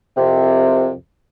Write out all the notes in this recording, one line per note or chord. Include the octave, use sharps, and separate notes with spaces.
C2 F2 C3